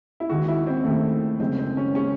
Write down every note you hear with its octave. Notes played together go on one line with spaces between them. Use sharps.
E4
D#2 D#3 G#3 F#4
E4
C4
D#2 D#3 G#3 A3
F#1 F#2 C#3 G#3 C4
C4
C#4
C#3 G#3 C#4